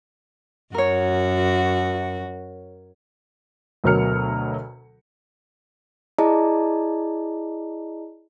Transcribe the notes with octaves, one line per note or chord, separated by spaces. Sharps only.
F#2 F#4 A#4 C#5
D2 B2 F#3 A#4 F6 C#7
E4 G#4 D5 D#5 A5 A#5